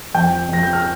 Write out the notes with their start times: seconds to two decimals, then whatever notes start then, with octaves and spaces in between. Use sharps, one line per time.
0.15 F2 G5 G6
0.49 F2 A#6
0.63 G6
0.73 F6